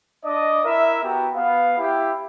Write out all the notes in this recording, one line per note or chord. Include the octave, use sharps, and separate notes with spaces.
D4 D5 D#5
E4 A#4 E5
B3 F#4 G4 A#5
B3 F5
E4 G4